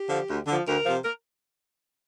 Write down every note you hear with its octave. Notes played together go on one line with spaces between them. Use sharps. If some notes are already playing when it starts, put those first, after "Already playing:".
Already playing: G4
D3 F3
D2
D3 F3
D2 A#4
C3 F3
A#4